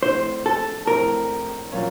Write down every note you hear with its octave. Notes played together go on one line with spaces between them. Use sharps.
A#1 A2 A3 C4 C5
A4
A#1 A2 A3 C4 A#4
A#2 F#3 A#3 C#4